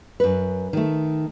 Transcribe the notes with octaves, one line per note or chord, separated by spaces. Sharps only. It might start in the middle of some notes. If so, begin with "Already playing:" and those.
F#2 B4
D#3 A3